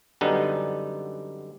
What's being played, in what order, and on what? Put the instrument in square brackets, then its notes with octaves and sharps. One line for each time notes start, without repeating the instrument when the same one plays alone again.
[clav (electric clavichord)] F#2 D3 G3 B3 D#4